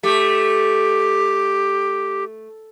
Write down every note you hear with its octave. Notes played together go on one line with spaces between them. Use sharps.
A3 G4